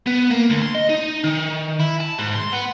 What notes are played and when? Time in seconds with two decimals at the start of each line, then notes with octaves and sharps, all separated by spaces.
0.06 B3
0.31 A#3
0.50 D2
0.62 C6
0.75 D#5
0.90 D#4
1.24 D#3
1.80 E4
2.00 A5
2.18 G#2
2.35 C6
2.52 B3